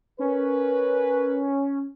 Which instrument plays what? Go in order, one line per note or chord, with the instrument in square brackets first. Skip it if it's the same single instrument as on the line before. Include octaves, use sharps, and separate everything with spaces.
[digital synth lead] C#4 [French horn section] A#4 B4